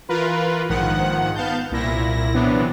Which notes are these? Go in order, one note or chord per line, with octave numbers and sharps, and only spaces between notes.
E3 F4 A#4 B4
A#1 G#2 D#3 F3 F#5
B3 F5 A5 G6
C2 A#2 E4 A#6
C3 E3 F#3 B3 D4